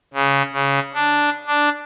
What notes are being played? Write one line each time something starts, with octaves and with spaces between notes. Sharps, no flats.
C#3
C#3
D4
D4